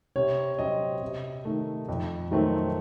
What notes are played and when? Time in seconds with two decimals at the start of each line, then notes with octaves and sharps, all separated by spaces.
0.16 C3 C#5
0.58 F#3 C4 D#5
1.02 C3
1.45 D#3 A3
1.89 F2
2.31 D#3 F#3 A3 C4